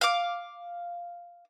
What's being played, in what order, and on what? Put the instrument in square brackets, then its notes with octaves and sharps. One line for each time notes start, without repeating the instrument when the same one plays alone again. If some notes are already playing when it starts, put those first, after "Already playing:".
[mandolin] F5 D6